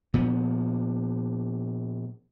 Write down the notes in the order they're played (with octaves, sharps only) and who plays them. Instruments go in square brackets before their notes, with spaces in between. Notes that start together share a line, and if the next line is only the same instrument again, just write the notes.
[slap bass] A#2 F3 B3